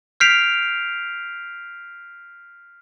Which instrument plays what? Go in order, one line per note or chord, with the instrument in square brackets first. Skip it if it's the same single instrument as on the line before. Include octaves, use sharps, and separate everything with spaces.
[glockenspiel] F6 G6 B6 C7 D7 F7